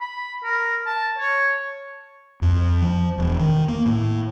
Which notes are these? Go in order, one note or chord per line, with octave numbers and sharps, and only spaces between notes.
B5
A#4
A5
C#5
F2
F3
E1
D#3
A#3
A2